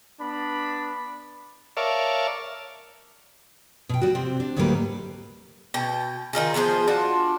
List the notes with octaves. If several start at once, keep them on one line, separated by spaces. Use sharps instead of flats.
B3 D4 B5
A#4 C#5 D5 E5 F5 A5
B2 G5
G3 F#4
C3 C4
D4
D2 G#2 F#3 G3 A#3 B4
B2 G5
D#3 D#4 F4 G#4
F3 B3 G#4 C5
D4 F4 F#4